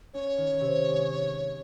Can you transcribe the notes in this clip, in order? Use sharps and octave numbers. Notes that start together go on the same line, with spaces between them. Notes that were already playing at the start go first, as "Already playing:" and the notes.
C#4 C#5
D#3
C3
G#3